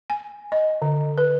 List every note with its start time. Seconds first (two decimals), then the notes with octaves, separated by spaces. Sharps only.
0.10 G#5
0.52 D#5
0.82 D3
1.18 B4